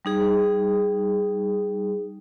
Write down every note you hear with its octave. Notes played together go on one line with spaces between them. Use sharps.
G3 D#4 G#4